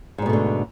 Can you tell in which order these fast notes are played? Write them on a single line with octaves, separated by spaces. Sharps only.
G#2 G3 B2 A3 D3